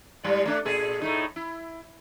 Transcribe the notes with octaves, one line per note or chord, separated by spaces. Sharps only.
G#2 G3 D5
A3 D4
A#2 G#4 A4
A2 A3 D#4
E4